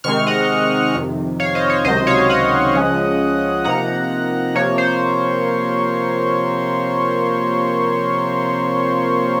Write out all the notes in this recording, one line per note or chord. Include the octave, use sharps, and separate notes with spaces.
C3 D#3 G#3 C4 C#6 F6
D#5 F#5
F2 C3 D#3
C#5 F5
C5 D#5
C#5
C#2 C3 D#3 F#3 C5 D#5
C#5 F5
D#5 F#5
C#2 C#3 F3 G#3 C#4
C3 F3 A#3 D#4 F#5 A#5
C3 F3 A#3 C#5
C5